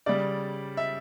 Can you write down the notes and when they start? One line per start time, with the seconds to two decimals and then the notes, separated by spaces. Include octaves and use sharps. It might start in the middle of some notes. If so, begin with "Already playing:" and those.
0.06 C#3 G3 D5
0.77 E5